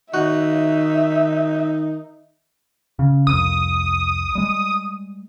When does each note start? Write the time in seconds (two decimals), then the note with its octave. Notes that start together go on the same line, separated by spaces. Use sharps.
0.14 D#3 D#4 F#4 E5
2.99 C#3
3.27 C2 F2 D#6
4.35 G3 G#3